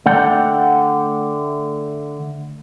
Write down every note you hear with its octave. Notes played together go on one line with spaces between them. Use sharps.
D3 A3 D5 F#5 G5